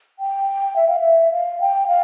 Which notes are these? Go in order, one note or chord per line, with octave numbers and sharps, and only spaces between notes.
G5
E5
F5
E5
F5
G5
F5